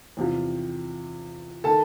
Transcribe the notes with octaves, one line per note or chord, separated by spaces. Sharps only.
E2 C3 F3
D#3 A4 A5